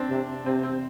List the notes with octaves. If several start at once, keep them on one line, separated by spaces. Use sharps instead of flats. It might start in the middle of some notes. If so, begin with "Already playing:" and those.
Already playing: C4 D4
C3
C3 C4
C4